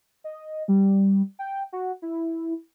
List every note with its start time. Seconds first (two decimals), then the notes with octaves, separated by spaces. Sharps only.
0.24 D#5
0.68 G3
1.39 G5
1.72 F#4
2.02 E4